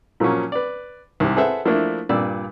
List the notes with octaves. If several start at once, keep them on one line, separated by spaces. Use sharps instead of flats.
A#2 F3 F#3 A#3 C#4
B4 D5
C2 G#2 G4
G#4 A4 B4 C5 E5 F#5
F3 A3 A#3 D4 E4
G2 A#2 D5 E6